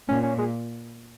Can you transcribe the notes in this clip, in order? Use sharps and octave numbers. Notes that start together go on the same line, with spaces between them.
A#2 C#4
C#4
G#3